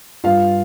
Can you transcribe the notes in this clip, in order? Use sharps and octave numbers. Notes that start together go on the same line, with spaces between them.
G2 F4 F5